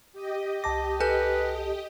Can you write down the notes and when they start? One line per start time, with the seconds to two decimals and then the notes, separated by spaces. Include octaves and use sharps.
0.13 G4 D#5
0.64 C2 A5 D6 A#6
1.00 A4 B4 G#5 G6